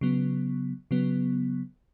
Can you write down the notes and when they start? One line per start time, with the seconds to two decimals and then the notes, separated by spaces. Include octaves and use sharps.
0.01 C#3 F#3 B3
0.91 C#3 F#3 B3